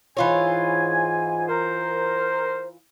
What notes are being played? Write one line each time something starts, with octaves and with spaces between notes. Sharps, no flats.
G#2 E3 F4 C#5 G#5
A#4 C5